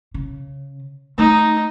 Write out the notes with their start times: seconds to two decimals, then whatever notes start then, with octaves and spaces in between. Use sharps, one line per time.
0.14 C#3
1.18 A3 D#4